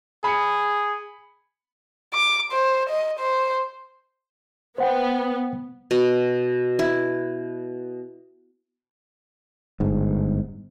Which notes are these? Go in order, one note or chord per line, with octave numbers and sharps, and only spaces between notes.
G#4 B5 C#7
D6
C5
D#5
C5
B3 C5 F#5 G5
B2
E4
G1 G#2